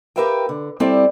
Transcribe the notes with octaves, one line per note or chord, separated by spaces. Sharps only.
G4 A#4 B4 E5 F5 G5
D3
G3 C4 E4 G4 A4 D5